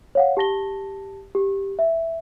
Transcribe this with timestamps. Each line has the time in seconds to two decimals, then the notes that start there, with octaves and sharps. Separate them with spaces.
0.15 C#5 F5 F#5
0.37 G4 A5 A#6 G7
1.35 G4
1.79 E5